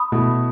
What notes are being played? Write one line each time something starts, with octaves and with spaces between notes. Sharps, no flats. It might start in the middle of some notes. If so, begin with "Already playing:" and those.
Already playing: B5 D#6
B2 A3 E4